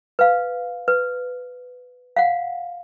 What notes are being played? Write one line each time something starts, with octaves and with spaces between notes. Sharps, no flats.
B4 F5
B4
F5 F#5